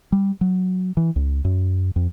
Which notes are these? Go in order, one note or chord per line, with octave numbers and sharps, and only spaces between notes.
G3
F#3
E3
C#2
F#2
F2